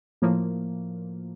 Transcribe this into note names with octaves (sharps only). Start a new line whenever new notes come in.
A2 F3 A#3